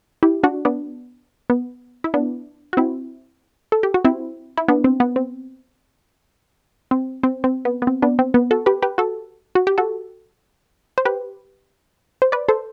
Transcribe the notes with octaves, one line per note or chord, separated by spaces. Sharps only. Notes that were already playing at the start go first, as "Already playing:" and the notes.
E4 G4
D4 F#4
B3 D4
B3
E4
B3 D4
F#4
C4 E4
A4
G4
F#4
C4 E4
E4
B3 D4
C4
B3
C4
C4
C4
C4
B3
B3
C4
B3 D4
C4
B3
F#4 A4
G4 B4
G4 B4
F#4 A4
F#4
G4
F#4 A4
C5
G4 B4
C5
B4 D5
A4 C5